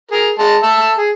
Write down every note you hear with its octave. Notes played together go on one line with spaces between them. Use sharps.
G#4 A#4
G#3 A5
E5 A5 E6
G#4